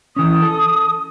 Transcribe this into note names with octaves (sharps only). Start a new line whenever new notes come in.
E3 C#4 D#6
A4